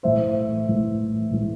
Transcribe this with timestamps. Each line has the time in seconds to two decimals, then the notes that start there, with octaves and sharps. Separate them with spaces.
0.03 A2 E3 A3 C5 E5
0.68 A2 E3 A3
1.31 A2 E3 A3